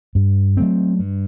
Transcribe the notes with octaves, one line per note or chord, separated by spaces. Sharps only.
G2
F#3 A3 C4
G2